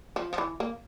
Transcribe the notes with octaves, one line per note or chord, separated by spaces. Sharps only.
F3
F3
E3
A#3